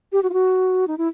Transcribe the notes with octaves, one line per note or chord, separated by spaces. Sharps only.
G4
F#4
F4
F#4
D#4
E4